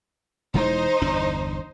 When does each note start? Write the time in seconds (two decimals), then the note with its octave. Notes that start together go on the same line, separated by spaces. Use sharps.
0.54 E1 E3 G#3 D#4 C5
1.02 G1 E2 D4